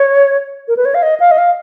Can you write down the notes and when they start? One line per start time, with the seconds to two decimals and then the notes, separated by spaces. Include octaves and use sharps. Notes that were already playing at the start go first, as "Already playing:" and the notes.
Already playing: C#5
0.68 A#4
0.77 B4
0.85 C#5
0.94 F5
1.02 D#5
1.20 F5
1.31 D#5
1.38 F5